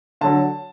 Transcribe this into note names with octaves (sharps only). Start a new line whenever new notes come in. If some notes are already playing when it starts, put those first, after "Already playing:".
D3 F#3 A5